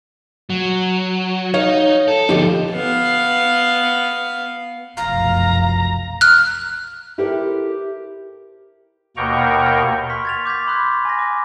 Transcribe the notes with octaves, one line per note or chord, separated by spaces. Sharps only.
F#3
D#4 C#5 F5
A4
D2 F3 D#4 G4 A4
B3 F5
F1 B1 F#2 F5 A#5
F6 F#6
E4 G4 A4 A#4 C5
D#2 B2 A#3 G5 A#5 C#6
C6 C#6 F6 B6
G#6 A6 F7
D6 G6 G#6 B6
B5 C6 D#6 F#6
G#5 B5 A#6
D6